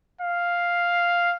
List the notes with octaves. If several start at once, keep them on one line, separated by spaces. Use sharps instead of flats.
F5